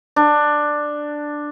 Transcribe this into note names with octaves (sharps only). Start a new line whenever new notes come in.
D4